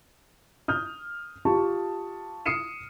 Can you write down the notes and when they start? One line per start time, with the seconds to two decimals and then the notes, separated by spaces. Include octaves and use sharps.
0.68 D#6 F6 G6
1.45 F4 G4 A5 C#6
2.46 D#6 F6 C7 C#7 D#7 E7